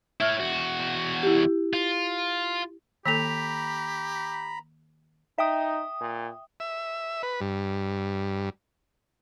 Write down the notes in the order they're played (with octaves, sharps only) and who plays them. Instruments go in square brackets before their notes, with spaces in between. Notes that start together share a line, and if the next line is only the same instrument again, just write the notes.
[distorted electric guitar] E4 C#5 [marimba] E5 F6
[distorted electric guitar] E2 F#4
[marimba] E4 G4
[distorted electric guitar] F4
[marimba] D#3 A#3 A4 [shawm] G4 [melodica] A#5 B5 [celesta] B6 F7
[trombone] D#4 [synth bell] E5 G5 D#6
[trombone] A#2
[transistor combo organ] E5
B4
G2